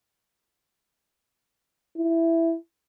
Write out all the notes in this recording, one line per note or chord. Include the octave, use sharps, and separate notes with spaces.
E4